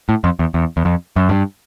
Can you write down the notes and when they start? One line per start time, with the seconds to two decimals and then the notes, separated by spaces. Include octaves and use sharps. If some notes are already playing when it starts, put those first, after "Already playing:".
0.09 A2
0.24 F2
0.39 E2
0.54 E2
0.77 E2
0.85 F2
1.16 F#2
1.29 G2